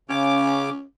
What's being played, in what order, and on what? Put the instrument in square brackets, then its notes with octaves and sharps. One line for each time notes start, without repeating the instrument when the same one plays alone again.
[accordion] C#3 D6 [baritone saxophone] C#4